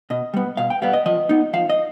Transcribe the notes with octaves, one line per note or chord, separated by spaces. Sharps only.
B2 D#5
G3 B3
B2 F5
G5
G3 B3 F5
D#5
F3 D#5
B3 D#4
F3 F5
D#5